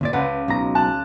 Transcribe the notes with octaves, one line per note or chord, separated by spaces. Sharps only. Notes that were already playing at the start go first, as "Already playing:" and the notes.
D2 A#2 D5
C#2 B4 F#5
B1 B2 A#5
A5 F#6